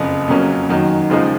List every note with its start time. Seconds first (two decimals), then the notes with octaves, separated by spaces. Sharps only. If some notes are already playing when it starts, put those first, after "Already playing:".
Already playing: F#1 F2 C#3
0.28 F2 C#3 F#3 A#3 C#4
0.69 F#2 D#3 F#3
1.10 D#2 C#3 F3 G#3 D#4